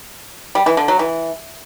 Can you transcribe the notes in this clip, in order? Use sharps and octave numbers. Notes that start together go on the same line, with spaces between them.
G3
E3
D3
F#3
E3